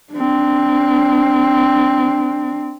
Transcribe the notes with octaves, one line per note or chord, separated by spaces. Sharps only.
C4 D4